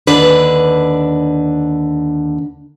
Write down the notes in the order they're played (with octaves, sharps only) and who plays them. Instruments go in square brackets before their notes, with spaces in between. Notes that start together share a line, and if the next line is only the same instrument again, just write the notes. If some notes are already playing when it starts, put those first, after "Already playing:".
[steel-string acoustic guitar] D#2 D3 D4 B4